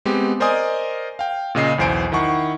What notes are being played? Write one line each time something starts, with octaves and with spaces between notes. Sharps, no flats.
G#3 B3 C4 G4
A#4 C5 D5 D#5 G#5 D#6
F5 G5
A#2 C#3 D#5 C7
B1 E2 C5 G#5 D7
D#3 E4 F#5 C#6